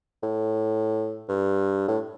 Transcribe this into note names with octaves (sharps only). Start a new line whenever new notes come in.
A2
G2
A2